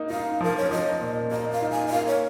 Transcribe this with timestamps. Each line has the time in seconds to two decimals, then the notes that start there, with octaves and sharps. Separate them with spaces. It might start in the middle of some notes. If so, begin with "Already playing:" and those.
Already playing: A#3 D#4
0.10 D#4 F5
0.41 F3 A#4
0.57 C#5
0.71 F3 D#5
1.01 A#2
1.31 A#3 D#5
1.52 F5
1.62 D#4
1.72 G#5
1.88 D#5
1.92 A#3 F5
2.07 C#5